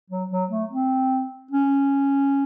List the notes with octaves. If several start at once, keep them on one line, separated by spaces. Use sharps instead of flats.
F#3
F#3
A3
C4
C#4